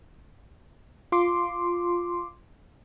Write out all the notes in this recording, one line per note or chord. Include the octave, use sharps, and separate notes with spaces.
F4 C6 D6